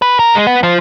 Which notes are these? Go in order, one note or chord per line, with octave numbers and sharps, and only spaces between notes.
B4
A#4
G#3
B3
F3